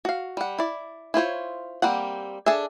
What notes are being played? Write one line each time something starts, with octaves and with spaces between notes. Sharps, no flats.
F#4 F5
G3 F#5
E4 D5
E4 F4 C5 C#5
G3 A#3 C4 F#5
D4 G#4 A4 E5